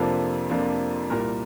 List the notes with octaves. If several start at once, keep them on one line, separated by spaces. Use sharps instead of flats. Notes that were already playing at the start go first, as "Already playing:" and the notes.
Already playing: F2 C3 F3 A#3 D4 A4
F2 C3 F3 A#3 D4
C2 A#2 G3 A#4